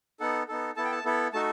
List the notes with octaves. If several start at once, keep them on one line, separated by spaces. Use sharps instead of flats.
B3 D#4 A4 F#5
B3 D#4 A4
B3 E4 A4 A5
G5
A5
B3 E4 A4
A3 D#4 F#4 A4 A5